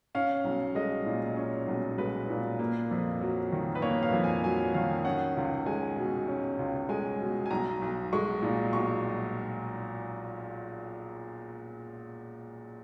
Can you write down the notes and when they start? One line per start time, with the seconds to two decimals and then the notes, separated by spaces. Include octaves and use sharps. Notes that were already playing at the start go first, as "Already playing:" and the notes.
0.15 C#4 F5
0.44 B1
0.75 G#3 D#5
1.06 A#2
1.36 C#4
1.67 B1
1.98 G#3 B4
2.30 A#2
2.59 A#3
2.91 F2
3.21 F#3
3.52 D#3
3.75 B4
3.82 A#3 C#5
4.03 F5
4.13 F2
4.24 G#5
4.44 F#3 G#5
4.74 D#3 F5
5.05 C#4 F#5
5.37 C#2
5.66 G#3 G#5
5.97 B2
6.28 C#4
6.59 C#2
6.89 G#3 G#5
7.20 B2
7.46 G#5
7.51 B1 A#5
7.82 B1
8.13 G#3 C#6
8.42 A#2
8.73 B1 C#6